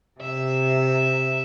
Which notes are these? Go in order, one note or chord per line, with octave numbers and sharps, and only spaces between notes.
C3 E5